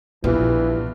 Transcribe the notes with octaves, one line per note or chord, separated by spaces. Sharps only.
A#1 G2 E3 B3 F4